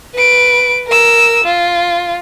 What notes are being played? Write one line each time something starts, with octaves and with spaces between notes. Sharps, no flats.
B4 D7
A#4 E6
F4